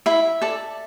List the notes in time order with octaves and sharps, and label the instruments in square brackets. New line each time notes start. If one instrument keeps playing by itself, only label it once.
[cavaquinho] E4 E5
A4 D5